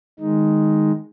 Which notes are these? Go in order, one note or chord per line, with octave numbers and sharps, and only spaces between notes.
D#3 G#3 D#4